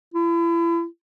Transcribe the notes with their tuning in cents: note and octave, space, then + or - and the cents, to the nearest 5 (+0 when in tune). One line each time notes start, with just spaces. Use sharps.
E4 +35